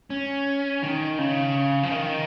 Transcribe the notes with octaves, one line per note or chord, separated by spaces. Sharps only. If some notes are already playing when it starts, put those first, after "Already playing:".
C#4
D#3
C#3
F3
D#3